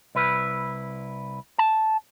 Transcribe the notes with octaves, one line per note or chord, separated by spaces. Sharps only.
C2 E4 B4
A5